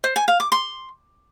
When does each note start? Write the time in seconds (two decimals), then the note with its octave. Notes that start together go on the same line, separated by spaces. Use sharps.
0.04 C5
0.16 G#5
0.28 F5
0.40 D6
0.52 C6